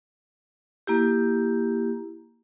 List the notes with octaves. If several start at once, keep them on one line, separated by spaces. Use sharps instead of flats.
A#3 E4 G4